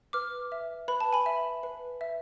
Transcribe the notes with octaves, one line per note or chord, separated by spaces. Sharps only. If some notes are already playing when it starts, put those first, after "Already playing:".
B4 D6 F6
E5
B4 B5
A5
G#5 B5
E5
B4
E5